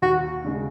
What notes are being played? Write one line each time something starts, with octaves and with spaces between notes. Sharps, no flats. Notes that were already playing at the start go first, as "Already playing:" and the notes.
D#2 F#4
C#3 G#3